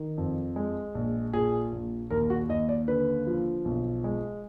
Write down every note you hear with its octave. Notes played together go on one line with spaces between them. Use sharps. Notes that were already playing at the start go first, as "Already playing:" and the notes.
Already playing: D#3
F2
G#3
A#1
A#2 G#4
A#1
D#2 A#4
F#4
D#2 D#5
D5
D3 B4
F3
B1
G#3